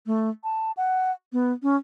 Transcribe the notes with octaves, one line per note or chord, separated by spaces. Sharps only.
A3
A5
F#5
B3
C#4